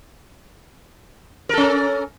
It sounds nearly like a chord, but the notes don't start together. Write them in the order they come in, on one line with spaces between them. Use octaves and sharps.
A#4 A4 C#4